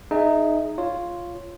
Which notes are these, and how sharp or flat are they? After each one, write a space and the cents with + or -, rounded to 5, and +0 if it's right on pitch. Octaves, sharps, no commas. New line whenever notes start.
D#4 -15 G#4 +15 E5 +0
F4 +0 C#5 +0